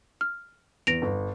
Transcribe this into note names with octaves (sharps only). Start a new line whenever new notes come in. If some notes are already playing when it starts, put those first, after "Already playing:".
F6
E2 A#6 D7 F7
G1